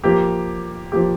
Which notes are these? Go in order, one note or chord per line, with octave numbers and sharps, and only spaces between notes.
F3 A#3 G4
F3 A#3 G4